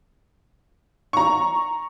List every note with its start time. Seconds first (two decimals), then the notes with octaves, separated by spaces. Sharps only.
1.13 A#5 C#6